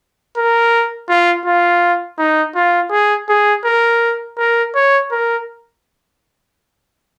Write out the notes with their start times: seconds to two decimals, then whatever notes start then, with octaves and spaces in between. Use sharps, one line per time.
0.37 A#4
1.09 F4
1.45 F4
2.18 D#4
2.55 F4
2.91 G#4
3.29 G#4
3.65 A#4
4.38 A#4
4.75 C#5
5.11 A#4